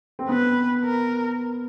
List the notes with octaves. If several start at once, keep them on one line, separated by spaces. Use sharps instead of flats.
C4
B3 B4
A#4